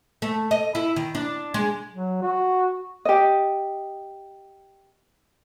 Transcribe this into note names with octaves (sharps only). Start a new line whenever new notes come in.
A3
D#5
E4
D#3
D4
G#3
F#3
F#4
G4 D#5